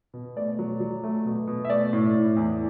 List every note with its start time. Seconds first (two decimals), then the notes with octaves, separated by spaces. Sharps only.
0.13 B2
0.36 A3 D5
0.59 F#3
0.80 F#3
1.03 A3
1.26 B2
1.47 B2
1.65 E5
1.70 A3 D5
1.93 A2
2.15 A2
2.37 E2